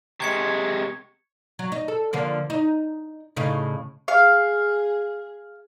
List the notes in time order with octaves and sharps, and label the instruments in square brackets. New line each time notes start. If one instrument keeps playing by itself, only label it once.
[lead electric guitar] C3 G#3 [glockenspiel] C#6 G#6 C#7
[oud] F#3
D#4
A4
D3 F3 A#3
D#4
A2 C#3 D#4
[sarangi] G#4 [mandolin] F5